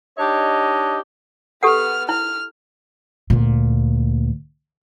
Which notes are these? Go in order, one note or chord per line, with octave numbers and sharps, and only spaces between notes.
D4 D#4 G4 C#5 D#5
B3 G4 A4 F#5 F6
E4 F6
D2 A#2